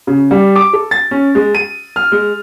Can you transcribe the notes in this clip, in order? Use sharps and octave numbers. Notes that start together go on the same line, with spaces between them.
C#3
G3
D6
A4
A6
C#4
G#3
D#7
F6
G#3